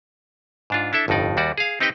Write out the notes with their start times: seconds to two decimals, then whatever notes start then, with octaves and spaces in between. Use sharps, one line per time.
0.70 G#2 D4 F4
0.93 D4 E4 A4 E5
1.08 G1 F2 A2 D#4 D5
1.37 D#2 G3 F#4 D5
1.58 G#4 F5
1.80 C4 D#4 G4 B4 D#5 G5